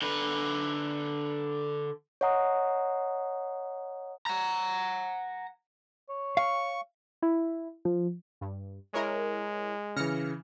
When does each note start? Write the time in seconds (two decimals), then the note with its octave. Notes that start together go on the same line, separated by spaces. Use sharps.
0.02 D3 B4
2.21 C#5 D#5 F#5 A#5 D#6
4.26 F#5 A#5
6.09 C#5
6.37 F5 C#6
7.23 E4
7.85 F3
8.41 G2
8.94 G#3 E4 A#4 C#5
9.96 C#3 E3 F6 A#6 C#7